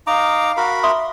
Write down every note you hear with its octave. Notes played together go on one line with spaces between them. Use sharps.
D#4 F5 A#5 D6
F#4 A#4 B5
E5 C6 D#6